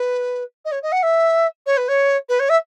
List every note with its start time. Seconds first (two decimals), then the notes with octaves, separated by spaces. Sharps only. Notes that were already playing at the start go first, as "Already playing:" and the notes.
Already playing: B4
0.65 D#5
0.72 C#5
0.82 D#5
0.92 F#5
1.03 E5
1.66 C#5
1.77 B4
1.88 C#5
2.29 B4
2.39 C#5
2.49 E5